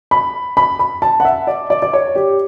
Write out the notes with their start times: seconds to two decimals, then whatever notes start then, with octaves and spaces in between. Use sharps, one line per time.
0.11 B5
0.57 B5
0.79 B5
1.02 A5
1.20 F#5
1.25 E5
1.47 D5
1.70 D5
1.82 D5
1.93 C#5
2.15 G4